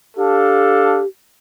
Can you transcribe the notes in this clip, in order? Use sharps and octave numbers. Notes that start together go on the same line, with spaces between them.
D4 G4 A4 F5